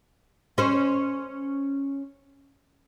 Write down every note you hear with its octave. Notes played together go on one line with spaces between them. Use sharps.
C#4 C5